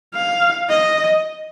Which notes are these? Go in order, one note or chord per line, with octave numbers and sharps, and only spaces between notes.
F5
D#5